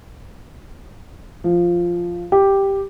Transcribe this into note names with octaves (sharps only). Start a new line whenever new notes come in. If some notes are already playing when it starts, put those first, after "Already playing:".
F3
G4